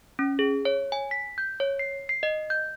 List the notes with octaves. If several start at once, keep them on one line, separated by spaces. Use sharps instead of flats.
C#4
G#4
C#5
G#5
B6
G6
C#5
C7
C7
D#5
G6